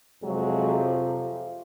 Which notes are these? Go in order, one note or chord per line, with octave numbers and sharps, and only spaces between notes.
F2 C3 F3 F#3 G#3